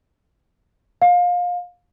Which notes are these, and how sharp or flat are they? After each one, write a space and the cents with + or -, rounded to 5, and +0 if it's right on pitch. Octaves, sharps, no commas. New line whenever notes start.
F5 +25